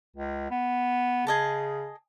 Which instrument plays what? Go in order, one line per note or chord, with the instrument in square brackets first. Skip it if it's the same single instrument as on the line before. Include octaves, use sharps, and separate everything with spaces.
[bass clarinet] C#2
B3
[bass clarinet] C#3 [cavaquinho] G#4 D#5 A5